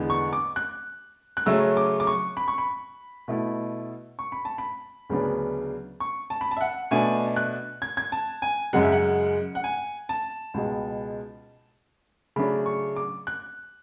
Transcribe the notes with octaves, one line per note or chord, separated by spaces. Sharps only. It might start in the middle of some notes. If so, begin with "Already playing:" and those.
Already playing: E2 D3 G#3 B3
C#6
D6
F#6
F#6
C#3 F#3 A3 C#4 E6
D6
D6
C#6
B5
C#6
B5
B2 A3 E4
C#6
B5
A5
B5
D2 C#3 F#3 B3 D4
C#6
A5
B5
A5
E5
F#5
B2 A3 D4 G#5
F#6
G#6
G#6
A5
G#5
F#2 C#3 G#3 F#5
E5
F#5
F#5
G#5
A5
C#2 B2 G#3
C#3 F#3 A3 D4 B5
C#6
D6
F#6